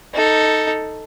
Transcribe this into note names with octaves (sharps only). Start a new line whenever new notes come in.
D#4 A4